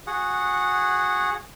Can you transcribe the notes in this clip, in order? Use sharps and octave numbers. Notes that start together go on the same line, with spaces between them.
F#4 G#4 F#5